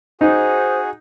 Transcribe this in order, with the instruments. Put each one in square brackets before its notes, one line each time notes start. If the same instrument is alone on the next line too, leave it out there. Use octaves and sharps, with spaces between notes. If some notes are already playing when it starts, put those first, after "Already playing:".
[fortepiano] D#4 [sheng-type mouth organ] F#4 G#4 [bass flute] C5